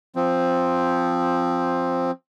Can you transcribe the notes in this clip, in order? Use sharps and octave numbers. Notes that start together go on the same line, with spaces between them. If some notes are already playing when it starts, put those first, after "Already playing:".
F3 C4